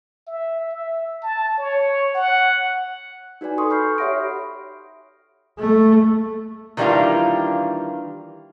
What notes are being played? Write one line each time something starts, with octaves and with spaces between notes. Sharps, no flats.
E5
E5
A5
C#5
F#5
D#4 F#4 B4 D5 G#5
F#4 A4 C6 C#6 D#6
B5 C#6 F6 G6 C7
G4 C#5 E5 F#5 A#6 D7
A3
D#3 E3 G3 A#3 D4 F4